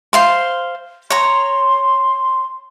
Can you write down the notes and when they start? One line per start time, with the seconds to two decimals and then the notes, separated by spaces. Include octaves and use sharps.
0.13 C5 F5 C6
1.10 C#5 A#5 C6